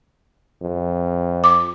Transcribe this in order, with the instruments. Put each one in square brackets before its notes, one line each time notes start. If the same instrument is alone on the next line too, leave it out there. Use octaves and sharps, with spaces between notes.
[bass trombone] F2
[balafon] D6